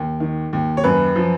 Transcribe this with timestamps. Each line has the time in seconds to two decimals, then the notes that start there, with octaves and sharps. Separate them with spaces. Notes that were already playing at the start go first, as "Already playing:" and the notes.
Already playing: D#2
0.20 D#3
0.53 D#2
0.77 C#5
0.84 F#2 B4
1.16 F3